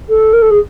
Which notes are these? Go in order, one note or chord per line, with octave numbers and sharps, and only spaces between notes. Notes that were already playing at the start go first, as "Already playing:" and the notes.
A4
A#4
A4
G#4